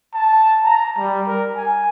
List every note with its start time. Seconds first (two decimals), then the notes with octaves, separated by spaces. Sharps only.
0.14 A5
0.64 A#5
0.98 G3
1.28 A#4
1.56 G#5